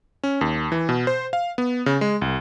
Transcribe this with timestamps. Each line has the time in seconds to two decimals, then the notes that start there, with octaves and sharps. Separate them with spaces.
0.24 C#4
0.41 D#2
0.72 E3
0.89 B2
1.07 C5
1.33 F5
1.58 B3
1.86 C#3
2.01 G#3
2.22 C2